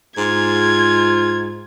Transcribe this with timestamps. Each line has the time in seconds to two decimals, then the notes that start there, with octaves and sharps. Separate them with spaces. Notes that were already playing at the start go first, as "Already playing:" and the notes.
0.18 G#2 F4 G#6